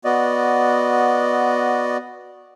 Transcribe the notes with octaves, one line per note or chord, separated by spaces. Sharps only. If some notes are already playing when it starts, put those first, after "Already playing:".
B3 F#4 D5 D#5